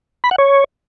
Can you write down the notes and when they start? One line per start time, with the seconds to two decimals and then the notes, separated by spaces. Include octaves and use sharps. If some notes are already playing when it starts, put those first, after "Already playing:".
0.24 B5
0.31 F#5
0.38 C#5